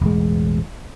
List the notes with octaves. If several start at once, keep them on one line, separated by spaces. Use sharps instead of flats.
E1 A1 G#3